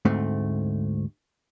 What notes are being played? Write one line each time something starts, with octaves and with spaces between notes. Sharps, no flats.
D2 G#2 A3 C4